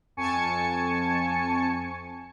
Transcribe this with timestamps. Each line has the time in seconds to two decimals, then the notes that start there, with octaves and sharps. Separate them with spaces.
0.17 F2 G#5 A5 C#6 C#7